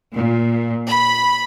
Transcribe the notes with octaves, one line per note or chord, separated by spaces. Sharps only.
A#2
B5